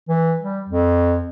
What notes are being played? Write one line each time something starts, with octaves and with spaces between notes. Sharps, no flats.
E3
G3
F2